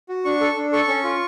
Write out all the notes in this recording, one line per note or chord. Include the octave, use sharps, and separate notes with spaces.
F#4
D4 C#6
A4
D4
A4 C#6
C#4
F4